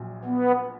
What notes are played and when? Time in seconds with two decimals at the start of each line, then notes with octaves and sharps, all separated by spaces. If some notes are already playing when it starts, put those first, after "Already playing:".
Already playing: A#1 A#2 F#3
0.25 B3